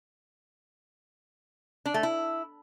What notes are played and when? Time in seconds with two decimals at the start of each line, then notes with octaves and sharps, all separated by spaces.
1.86 D4
1.94 A3
2.03 E4